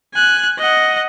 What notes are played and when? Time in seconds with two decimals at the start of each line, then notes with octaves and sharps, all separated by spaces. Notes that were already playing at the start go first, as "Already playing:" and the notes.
0.14 G#5 F#6
0.58 D#5 F#5